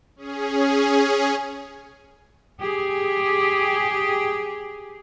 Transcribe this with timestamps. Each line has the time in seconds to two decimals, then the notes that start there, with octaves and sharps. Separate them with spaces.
0.16 C#4 G#4
2.60 G4 G#4